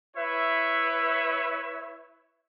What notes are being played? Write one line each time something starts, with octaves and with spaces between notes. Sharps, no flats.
E4 B4 C#5 E5